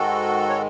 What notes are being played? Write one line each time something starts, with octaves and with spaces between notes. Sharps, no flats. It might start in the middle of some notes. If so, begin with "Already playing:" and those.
Already playing: G#2 D#3 G#3 F#4 A4
C#5